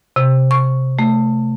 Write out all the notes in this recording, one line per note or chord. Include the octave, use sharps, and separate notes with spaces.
C3
C#6
A3